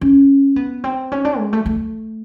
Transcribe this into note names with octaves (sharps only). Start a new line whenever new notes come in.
C#4
B3
C4
C#4
D4
G#3
A3
A3